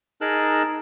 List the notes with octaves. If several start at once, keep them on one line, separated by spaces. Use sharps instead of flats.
D#4 G#4 A#4 A5 E6 F#6